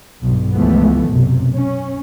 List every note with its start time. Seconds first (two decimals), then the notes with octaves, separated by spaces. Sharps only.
0.23 B1 G2
0.55 C#2 E3 F3 G#3 A3 B3
1.08 B1 F#2 C3
1.56 C#4